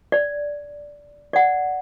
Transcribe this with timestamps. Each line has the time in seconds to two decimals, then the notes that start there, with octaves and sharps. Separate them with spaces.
0.12 D5
1.33 D5 F#5